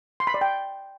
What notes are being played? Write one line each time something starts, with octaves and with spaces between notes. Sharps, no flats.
C6
B5
D5
G5